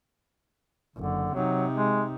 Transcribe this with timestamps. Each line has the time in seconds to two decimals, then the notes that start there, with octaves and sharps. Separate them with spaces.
0.96 F#1 D3
1.34 C3 F#3 D#4
1.77 G#3